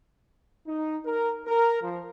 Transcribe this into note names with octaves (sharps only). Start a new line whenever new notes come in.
D#4
A#4
A#4
F3